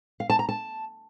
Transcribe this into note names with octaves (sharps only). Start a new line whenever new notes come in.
F5
A5
A#5
A5